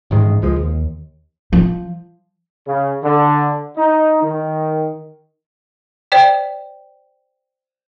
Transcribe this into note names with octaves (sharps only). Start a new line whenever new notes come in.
A1 G#2 D#3 G#3
C#2 F3 G#3
D#2
F3
C#3
D3
D#4
D#3
C5 D5 G5